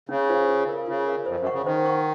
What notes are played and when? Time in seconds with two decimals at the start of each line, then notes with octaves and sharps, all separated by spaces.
0.09 C#3 C#4
0.29 F4 C5 F5
0.49 F4
0.69 A#4 F5
0.87 C#3 F4
1.07 A#4 F5
1.26 F2 C5
1.40 F#2
1.46 F#5 C#6
1.53 C#3
1.66 D#3 C5
1.85 F#5 C#6